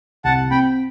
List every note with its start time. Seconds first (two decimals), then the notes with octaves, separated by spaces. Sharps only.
0.24 C2 F#5 A5
0.51 C4 G5 B5